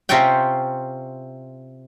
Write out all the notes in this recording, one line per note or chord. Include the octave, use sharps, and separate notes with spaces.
C3 C4 C#4 F4 C#5 G5